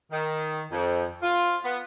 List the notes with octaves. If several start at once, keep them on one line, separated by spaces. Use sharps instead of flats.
D#3
F2
F4
B3